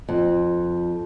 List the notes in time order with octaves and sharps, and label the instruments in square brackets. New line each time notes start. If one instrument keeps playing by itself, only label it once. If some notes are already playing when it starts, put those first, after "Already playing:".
[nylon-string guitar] F2